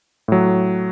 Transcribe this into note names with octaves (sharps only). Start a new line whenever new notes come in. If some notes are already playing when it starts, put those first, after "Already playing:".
A2 F#3